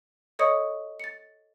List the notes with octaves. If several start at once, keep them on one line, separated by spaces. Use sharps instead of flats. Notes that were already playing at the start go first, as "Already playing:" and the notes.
A4 C#5 D#5 C#6 D#6 C#7
A6 C#7